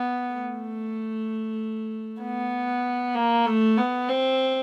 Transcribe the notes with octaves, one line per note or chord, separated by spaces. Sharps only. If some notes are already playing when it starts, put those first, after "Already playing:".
Already playing: B3
A3
B3
A#3
A3
B3
C4